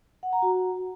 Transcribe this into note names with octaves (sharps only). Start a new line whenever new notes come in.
F#5
A#5
F#4